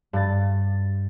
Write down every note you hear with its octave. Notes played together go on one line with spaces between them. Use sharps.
G2 A6